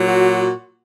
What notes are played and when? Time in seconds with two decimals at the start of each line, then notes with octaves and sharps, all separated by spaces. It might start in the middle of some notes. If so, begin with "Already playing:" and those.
Already playing: A#2 F#3
0.08 F#4